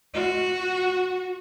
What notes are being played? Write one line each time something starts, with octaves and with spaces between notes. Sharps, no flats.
F#4